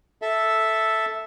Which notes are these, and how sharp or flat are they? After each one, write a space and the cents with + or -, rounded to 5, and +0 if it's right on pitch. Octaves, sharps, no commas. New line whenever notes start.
A4 +0 E5 +0